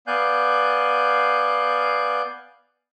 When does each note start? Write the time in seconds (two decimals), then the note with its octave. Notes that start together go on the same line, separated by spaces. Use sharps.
0.07 B3 D5 F5 G#5 F#6 G6